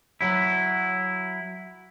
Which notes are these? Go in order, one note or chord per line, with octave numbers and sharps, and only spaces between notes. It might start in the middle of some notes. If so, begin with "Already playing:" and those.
F#3 E4